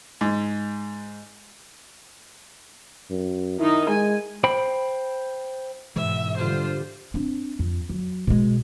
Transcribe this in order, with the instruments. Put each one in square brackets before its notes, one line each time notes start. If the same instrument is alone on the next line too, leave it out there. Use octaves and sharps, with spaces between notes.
[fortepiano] G#2
[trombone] F#2
[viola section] D#3 D#4 [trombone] E4
[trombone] G#3 [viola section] G#5
[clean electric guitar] C5 G5 B5
[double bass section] G#2 [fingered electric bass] B2 E3 G#3 [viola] E5
[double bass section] D3 G3 [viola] F4 C5
[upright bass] C4 D4
F2
F#3
B2 G#3